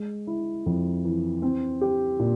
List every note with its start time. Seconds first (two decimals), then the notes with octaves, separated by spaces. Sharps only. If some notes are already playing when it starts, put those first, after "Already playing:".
Already playing: G#3
0.27 E4
0.66 F2
1.05 E3
1.42 C4
1.81 G4
2.19 A#2